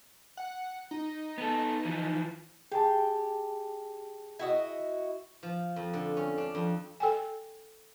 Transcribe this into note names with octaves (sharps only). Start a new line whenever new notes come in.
F#5
D#4
B3 A4
E3 F3
G4 G#4 A5
E4 F#4 D#5
F3
F2
D3
C#4
D4
F2
A4 G5 G#5